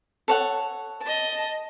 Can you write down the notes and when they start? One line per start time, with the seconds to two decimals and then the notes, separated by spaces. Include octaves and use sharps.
0.28 A4 C#5 F#5
1.01 D#5 A5